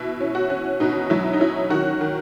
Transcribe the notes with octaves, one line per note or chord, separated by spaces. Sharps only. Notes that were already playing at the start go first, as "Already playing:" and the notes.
Already playing: B2 E4
C#4
F#4
C#4
B2 D#4
F#3 E4
D#4
C#4 E4
D#3 F#4
D#3